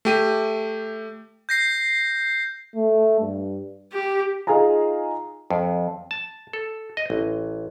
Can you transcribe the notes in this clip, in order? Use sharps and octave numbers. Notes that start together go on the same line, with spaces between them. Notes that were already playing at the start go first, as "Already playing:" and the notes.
A3 G4 D#7
G6 A#6 C7
A3
G2
G4
D#4 F4 G#4 F5 G#5 A#5
F2
A5
A4
D#5
A1